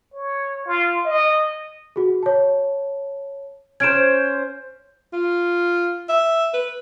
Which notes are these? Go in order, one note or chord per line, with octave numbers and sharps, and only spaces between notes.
C#5
F4
D#5
F#4 G#4
C#5 A5
C#4 C5 G#6 D7 E7
F4
E5
B4